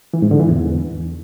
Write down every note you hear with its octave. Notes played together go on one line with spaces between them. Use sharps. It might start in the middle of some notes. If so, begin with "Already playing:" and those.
E3
G#2
D3
E3
E2